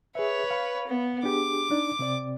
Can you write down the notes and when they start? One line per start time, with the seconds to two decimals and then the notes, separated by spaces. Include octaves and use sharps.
0.15 G#4 B4 C#5 E5
0.50 F5 B5
0.87 B3
1.23 D4 G4 G#4 D6
1.71 D4 D#4 D5
1.99 C3 C4 D5